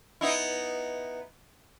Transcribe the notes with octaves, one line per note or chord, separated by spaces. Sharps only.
B3 D#4 E4